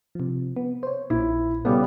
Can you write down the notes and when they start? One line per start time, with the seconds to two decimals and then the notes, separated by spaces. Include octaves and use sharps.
0.15 C3 F3
0.57 B3
0.83 C5 C#5
1.10 A#1 A#2 E4
1.65 C#3 G3 B3 A4 D5